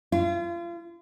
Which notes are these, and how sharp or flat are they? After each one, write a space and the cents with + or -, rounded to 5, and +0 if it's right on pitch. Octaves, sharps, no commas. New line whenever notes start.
F4 -35